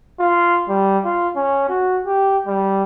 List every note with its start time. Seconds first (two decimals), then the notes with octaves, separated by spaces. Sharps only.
0.20 F4
0.69 G3
1.05 F4
1.36 C#4
1.69 F#4
2.06 G4
2.47 G3